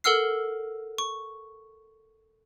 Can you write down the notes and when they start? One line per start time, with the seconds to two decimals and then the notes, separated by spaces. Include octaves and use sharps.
0.04 A4 A#4 F#5 E6 F6 C7
0.98 C#6